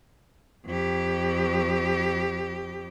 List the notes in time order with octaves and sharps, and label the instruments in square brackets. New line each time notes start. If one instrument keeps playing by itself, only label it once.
[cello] F2 G4